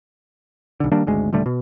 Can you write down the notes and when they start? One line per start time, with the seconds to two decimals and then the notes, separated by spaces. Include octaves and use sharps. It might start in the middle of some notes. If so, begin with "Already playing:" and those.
0.80 B1 D3
0.92 D#3 G3 A#3 D4
1.07 G#1 D2 G#3
1.33 D#1 D3 G3 A3
1.46 B2